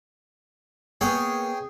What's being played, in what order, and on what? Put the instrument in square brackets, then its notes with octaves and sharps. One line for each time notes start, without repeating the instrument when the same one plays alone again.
[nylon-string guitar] A#3 B3 [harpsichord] G#4 C#5 G5